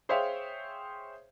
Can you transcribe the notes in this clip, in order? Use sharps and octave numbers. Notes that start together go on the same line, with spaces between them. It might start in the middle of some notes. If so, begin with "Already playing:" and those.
G#4 C5 C#5 E5 F5 G5